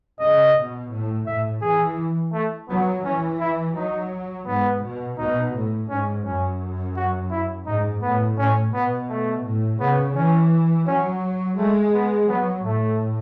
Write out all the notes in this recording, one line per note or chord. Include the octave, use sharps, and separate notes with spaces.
C#3 D#5
B2
A2
A2 E5
E3 G#4
A3
F#3 B3
E3 C#4
E4
F#3 D#4
G#2 B3
B2
B2 D#4
A2
G#2 C#4
F#2 C#4
F#4
E4
G#2 D#4
A2 B3
A2 C#4
B2 B3
A3
A2
C#3 B3
E3 C#4
F#3 C#4
G#3 A3
B3
F#3 B3
A2 A3